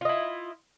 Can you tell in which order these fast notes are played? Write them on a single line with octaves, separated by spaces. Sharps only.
F4 D#5 E4